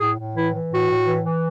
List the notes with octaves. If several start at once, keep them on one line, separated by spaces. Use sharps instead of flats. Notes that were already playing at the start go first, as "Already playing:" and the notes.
A2 G#4
A2
E3 E4
E3
A2 F#4
A2
E3
E3